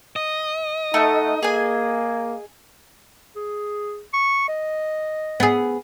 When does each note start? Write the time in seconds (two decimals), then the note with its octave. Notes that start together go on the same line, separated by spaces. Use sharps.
0.16 D#5
0.94 A3 D#4 F#5
1.43 A#3 G#4 G#5
3.36 G#4
4.14 C#6
4.49 D#5
5.40 B3 G#4